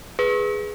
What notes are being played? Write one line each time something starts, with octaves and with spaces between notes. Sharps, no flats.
G#4 B4